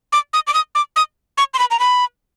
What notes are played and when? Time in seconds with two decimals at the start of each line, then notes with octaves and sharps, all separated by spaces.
0.12 D6
0.33 D#6
0.47 D6
0.54 D#6
0.75 D6
0.96 D#6
1.38 C#6
1.54 C6
1.59 B5
1.71 A#5
1.79 B5